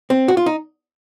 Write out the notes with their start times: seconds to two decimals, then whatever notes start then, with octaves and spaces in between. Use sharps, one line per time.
0.10 C4
0.28 F#4
0.37 F4
0.46 D#4